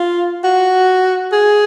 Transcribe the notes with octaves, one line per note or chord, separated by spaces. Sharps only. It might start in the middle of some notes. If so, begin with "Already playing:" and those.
Already playing: F4
F#4
G#4